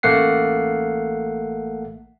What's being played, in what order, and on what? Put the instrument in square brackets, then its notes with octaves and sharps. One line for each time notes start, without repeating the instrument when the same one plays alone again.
[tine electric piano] A1 A3 A#3 F#5 C7